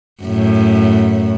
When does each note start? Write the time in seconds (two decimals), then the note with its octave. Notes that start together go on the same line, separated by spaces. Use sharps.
0.23 F#2 A2